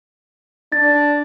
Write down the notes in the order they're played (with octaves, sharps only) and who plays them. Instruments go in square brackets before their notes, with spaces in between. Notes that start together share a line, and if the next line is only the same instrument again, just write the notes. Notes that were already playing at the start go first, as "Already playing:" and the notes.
[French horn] D4 [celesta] A6